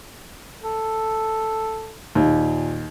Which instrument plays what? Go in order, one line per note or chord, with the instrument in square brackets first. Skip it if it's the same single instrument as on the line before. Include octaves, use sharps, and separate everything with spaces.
[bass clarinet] A4
[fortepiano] D#2 [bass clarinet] A#2